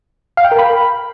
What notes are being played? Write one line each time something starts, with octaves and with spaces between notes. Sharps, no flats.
F5
G5
A#4
B5